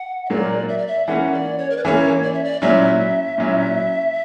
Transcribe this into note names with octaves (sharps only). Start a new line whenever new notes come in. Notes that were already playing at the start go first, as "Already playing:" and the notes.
Already playing: F#5
E5
A#2 F#3 A#3 D5
E5
D5
E5
E3 A#3 C#4 F#5
D5
C#5
A#4
B4
E3 A#3 C#4 C#5
D5
E5
D5
A#2 F#3 C#4 E4 E5
A#2 F#3 C#4 E4